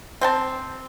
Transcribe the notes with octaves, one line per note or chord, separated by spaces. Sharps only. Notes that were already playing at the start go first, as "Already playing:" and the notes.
C4 G5 A5